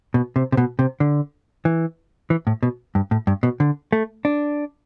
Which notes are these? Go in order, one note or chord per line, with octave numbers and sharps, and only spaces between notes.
B2
C3
C3
B2
C3
D3
E3
E3
A2
B2
G2
A2
G2
B2
D3
A3
D4